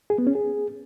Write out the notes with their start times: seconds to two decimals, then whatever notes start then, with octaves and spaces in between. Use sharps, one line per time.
0.10 G#4
0.18 B3
0.27 C#4
0.35 G#4